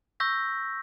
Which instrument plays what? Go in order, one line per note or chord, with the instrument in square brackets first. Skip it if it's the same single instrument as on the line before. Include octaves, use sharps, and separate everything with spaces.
[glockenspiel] C#6 E6 G6 A#6 B6